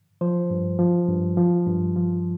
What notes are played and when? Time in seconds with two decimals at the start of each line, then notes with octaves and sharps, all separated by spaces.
0.21 F3 C5
0.50 G2
0.79 F3
1.08 G2
1.37 F3
1.67 G2
1.96 F3